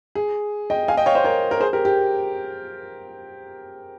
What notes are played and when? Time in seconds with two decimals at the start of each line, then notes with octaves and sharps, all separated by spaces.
0.15 G#4
0.70 D#5 G5
0.88 F5 G#5
0.97 D#5 G5
1.06 C#5 F5
1.15 C5 D#5
1.24 A#4 C#5
1.51 A#4
1.60 G#4 C5
1.73 G4 A#4
1.85 G4